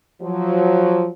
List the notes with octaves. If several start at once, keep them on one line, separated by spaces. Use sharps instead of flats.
F3 F#3